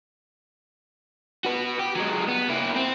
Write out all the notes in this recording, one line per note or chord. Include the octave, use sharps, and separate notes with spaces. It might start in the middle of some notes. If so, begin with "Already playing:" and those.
F#4 B4
G4
F#3 G#3
B3
A#3 E4
C4